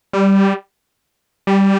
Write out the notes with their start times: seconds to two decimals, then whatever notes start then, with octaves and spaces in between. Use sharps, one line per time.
0.13 G3
1.47 G3